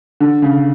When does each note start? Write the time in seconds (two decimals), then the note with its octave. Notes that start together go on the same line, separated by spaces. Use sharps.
0.20 D3
0.42 C#3